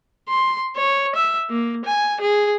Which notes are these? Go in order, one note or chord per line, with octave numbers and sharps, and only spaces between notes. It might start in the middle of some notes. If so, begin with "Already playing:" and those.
C6
C#5
E5
A#3
G#5
G#4